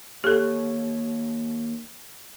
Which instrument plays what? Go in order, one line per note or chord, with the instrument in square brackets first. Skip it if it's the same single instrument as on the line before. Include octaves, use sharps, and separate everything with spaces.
[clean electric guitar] D#2 C#5 [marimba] G4 A4